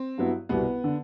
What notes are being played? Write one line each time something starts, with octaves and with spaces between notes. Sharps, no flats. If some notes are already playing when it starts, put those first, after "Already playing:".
Already playing: C4
G2 F#3 B3 E4
C2 B2 G3 B3
D3